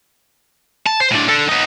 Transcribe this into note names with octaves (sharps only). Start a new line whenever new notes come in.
A5
C5
A2 D4
D4 A4
B3 D#4